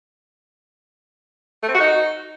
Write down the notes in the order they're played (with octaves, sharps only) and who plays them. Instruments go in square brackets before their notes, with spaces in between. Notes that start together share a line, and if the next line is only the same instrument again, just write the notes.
[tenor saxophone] A3
C4
F#4
D#4